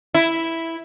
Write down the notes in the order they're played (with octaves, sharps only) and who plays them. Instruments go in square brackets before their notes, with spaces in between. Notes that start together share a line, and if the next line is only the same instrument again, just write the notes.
[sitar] E4